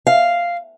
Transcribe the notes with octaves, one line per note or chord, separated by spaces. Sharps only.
F5